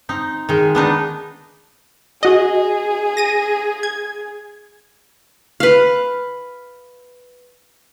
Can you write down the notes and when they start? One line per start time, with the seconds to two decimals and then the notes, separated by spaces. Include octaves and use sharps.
0.09 C4 D#4
0.49 D#3 G#3
0.75 B3 D4 D#4
2.23 F#4 G#4 D#5
3.17 A#6 D#7
3.83 G#6
5.60 B4 F5